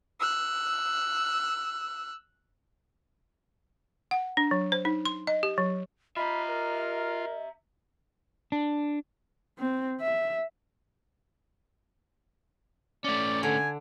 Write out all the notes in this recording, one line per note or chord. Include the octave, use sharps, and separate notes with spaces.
E6 F#6
F#5
D4
F#3
C5
D#4
C6
D#5
G4
F#3
F4 D#5 E5 A#5 B5
A#4
D4
C4
E5
A3 C#4 D5
D3 G#5